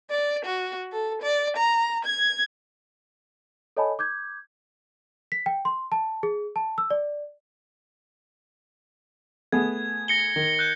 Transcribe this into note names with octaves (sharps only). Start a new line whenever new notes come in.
D5
F#4
A4
D5
A#5
G#6
A4 C#5 D#5 G#5 A5 B5
D6 G6 G#6
B6
G5
C6
A5
G#4
A5
E6
D5
A3 B3 G#4 G#6
A#6 C#7 G7
D#3
F#6 G6